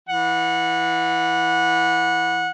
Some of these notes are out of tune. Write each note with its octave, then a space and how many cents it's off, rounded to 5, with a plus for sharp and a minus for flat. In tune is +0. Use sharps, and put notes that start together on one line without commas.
E3 +0 F#5 -20